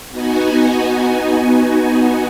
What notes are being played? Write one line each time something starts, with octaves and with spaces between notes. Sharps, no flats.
B3 D#4 F#4 G#5